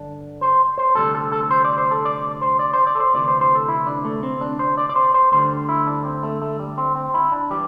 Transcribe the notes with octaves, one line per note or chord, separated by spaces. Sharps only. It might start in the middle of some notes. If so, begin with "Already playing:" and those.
Already playing: G2 D3 D4
C5
C5
D2 C3 G3 A4
A4
A4
A4
C5
D5
C5
A4
D5
C5
D5
C5
D5
A4
C5
D2 C3 E3 D5
C5
C5
A4
E4
D4
A3
C4
D4
C5
D5
D5
C5
C5
D2 D3 G3 C5
E4
D4
C4
A3
A3
G3
C4
C4
E4
D4
E3 G3 G4